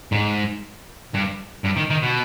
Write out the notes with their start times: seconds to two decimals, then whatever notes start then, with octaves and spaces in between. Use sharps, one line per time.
0.12 G#2
1.14 G2
1.65 G2
1.77 D#3
1.91 D#3
2.03 B2